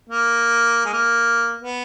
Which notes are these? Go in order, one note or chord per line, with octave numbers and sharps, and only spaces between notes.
A#3
G#3
A#3
B3